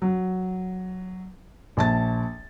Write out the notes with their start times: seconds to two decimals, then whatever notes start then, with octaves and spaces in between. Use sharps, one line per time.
0.02 F#3
1.77 A#1 A5 A6